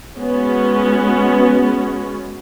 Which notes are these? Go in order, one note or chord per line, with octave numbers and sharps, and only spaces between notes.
G#3 B3 C#4 F#4